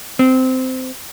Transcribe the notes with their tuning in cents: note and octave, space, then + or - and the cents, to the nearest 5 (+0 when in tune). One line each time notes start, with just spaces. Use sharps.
C4 -15